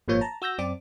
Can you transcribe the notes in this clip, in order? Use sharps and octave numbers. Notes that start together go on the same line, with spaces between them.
G#1 A#2 F3 A#3 C#5 G6
A5 A#5
F#4 E6 G6 A#6
F#2 C4 D5 D6